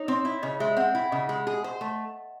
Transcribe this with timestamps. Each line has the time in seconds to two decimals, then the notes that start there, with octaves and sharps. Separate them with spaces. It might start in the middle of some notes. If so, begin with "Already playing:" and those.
Already playing: D#4 C#5
0.08 C4
0.25 E4
0.43 C#3 D#5
0.60 G#3 E5
0.77 C4 F#5
0.95 E4
1.11 C#3 D#5
1.29 G#3
1.47 G#4
1.64 C5
1.81 A3